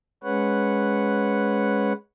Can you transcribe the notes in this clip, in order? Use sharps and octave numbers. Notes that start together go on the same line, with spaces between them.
G#3 C#4 B4 C#5 F#5